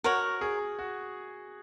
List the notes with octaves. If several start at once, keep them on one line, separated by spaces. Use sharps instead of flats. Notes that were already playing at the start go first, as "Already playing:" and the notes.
F#4 A#4 C#5 F#5
G#4
F#4